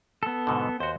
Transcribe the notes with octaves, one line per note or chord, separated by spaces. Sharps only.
B3 A4
G#2 B2 D3
D#2 F#4 C5